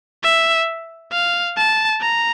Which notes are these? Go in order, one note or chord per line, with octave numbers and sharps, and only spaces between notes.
E5
F5
A5
A#5